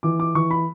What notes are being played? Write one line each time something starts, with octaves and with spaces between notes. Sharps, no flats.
E3 D6
D6
E3 C#6
B5